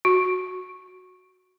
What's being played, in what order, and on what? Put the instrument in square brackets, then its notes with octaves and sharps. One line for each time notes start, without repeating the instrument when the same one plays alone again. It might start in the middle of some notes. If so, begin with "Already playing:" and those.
[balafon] F#4